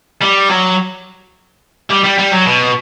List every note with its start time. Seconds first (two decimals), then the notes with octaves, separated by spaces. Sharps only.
0.22 G3
0.50 F#3
1.90 G3
2.04 G3
2.18 G3
2.31 F#3
2.45 B2